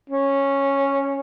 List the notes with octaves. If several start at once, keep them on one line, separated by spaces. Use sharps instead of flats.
C#4